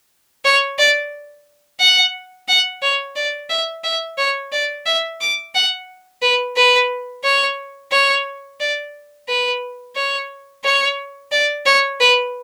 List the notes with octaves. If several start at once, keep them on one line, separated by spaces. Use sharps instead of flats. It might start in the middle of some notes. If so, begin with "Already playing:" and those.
C#5
D5
F#5
F#5
C#5
D5
E5
E5
C#5
D5
E5
D6
F#5
B4
B4
C#5
C#5
D5
B4
C#5
C#5
D5
C#5
B4